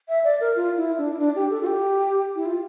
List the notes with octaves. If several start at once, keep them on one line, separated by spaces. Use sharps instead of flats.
E5
D5
A#4
F4
E4
D4
E4
D4
G4
A4
F4
G4
E4
F4